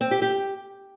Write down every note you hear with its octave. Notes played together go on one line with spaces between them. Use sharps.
C4
G4
G4